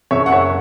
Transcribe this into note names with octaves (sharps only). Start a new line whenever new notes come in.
F#1 C#5 E5
F#5
C#5 E5